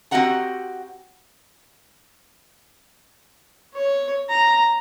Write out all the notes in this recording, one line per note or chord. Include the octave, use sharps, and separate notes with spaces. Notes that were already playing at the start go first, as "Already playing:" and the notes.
C4 F#4 G4 D#5 F#5 A#5
C#5
A#5